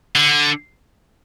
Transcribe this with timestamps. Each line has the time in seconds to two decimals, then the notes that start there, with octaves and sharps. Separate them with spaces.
0.16 D3